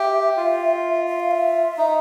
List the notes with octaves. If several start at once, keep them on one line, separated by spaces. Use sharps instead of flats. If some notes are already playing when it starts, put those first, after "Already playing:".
Already playing: G4 E5
F4
E5
F5
E5
D#4